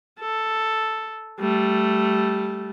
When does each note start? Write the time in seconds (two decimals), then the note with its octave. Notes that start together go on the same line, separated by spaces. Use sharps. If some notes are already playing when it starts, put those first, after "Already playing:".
0.20 A4
1.40 G3 A3